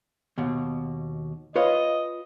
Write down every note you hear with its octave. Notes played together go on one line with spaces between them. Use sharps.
D#2 B2
F4 B4 C#5 D#5